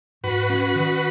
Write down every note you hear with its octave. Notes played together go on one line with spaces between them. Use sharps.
G#2 F#4 B4
C#4
D#3